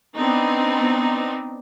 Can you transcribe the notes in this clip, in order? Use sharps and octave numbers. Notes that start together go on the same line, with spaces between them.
B3 C4 D4 D#4